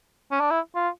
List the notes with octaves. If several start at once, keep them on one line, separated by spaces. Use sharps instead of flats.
C#4
D4
E4
F4